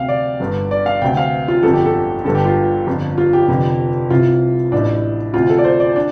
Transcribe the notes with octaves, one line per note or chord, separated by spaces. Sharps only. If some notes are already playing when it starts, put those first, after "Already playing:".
Already playing: D2 C3 F5 G5
D5
G1 G2 D3
D5
F5
D2 C3 G5
F5
F4
G1 F2 D3 A4
G4
A4
G1 G2 D3 A4
G4
F4
G1 F2 D3
F4
G4
F1 F2 D3
C2 C3 F4
A1 A2 D4
D2 C3 F4
A4
D5
C5
D5
D4